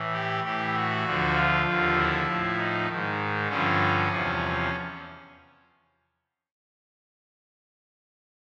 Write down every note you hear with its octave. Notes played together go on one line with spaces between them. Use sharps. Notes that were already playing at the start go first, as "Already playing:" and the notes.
Already playing: A2 E3
G4
A2 E3 G4
F#4
D2 D3 F3
F4
D#2 D3 F3
E4
A2 F3
D#4
G#2 D#3
G2 D3 F3 C#4
E2 C3 F3